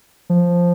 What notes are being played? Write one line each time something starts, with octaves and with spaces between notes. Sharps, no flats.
F3